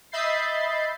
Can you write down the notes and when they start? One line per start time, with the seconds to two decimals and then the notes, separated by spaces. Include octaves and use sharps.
0.12 D#5 E5 B5 G6 A6 C7